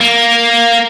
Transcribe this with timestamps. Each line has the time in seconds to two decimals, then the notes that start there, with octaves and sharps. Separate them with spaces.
0.01 A#3